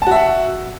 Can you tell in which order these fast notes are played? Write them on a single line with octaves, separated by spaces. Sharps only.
A5 F#4 E5 F#5